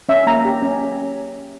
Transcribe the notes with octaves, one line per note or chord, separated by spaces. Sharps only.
C#4 E5
A#3 A#5
G4
C#4